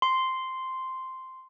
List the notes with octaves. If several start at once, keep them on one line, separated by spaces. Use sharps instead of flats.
C6